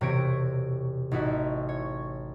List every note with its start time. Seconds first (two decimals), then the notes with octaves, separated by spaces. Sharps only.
0.01 E1 C3 G4 C#5 A#6 D7
1.11 A1 D#4 E4 F#4
1.69 C#5